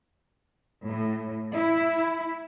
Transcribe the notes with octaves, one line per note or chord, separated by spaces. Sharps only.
A2
E4